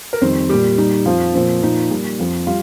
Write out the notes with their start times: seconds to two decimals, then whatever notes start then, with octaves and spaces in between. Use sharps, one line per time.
0.13 A#4
0.21 F2 D#3 G3 C4 C5
0.49 A#2 G3 G4
0.78 A#2 G3 D#4
1.06 F2 F3 F4
1.34 A#2 F3 C4
1.63 A#2 F3 D#4
1.91 A#2 G3
2.19 F2 F3
2.47 G3 F4